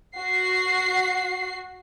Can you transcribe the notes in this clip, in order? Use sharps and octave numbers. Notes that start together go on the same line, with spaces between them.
F#4 C7